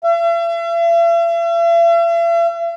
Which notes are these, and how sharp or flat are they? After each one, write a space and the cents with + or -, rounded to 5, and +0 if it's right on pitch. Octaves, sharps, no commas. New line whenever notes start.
E5 +45